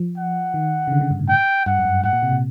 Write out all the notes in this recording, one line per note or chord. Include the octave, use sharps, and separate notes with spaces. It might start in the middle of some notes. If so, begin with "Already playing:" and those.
Already playing: F3
F#5
D#3
C#3
D3
C#3
G2
A2
G5
G2 F#5
F#2
G2
G#2 F#5
A#2
C3
A#2